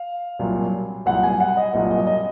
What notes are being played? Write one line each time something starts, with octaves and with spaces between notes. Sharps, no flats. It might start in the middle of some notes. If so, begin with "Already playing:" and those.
Already playing: F5
C2 A#2 F#3
C2 A#2 F#3 F#5
G#5
F#5
D#5
C2 A#2 F#3 D#5
D#5
D#5